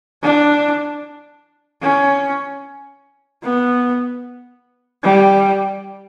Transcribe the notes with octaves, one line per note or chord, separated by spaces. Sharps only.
D4
C#4
B3
G3